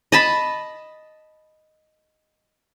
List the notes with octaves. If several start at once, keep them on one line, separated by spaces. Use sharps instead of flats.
D#5 A5 B5